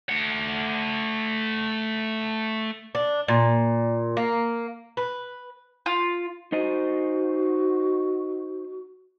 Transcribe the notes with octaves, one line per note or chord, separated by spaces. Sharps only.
A3 F#5
D4
A#2
A#3
B4
F4
D#4 F#4 C5 D#5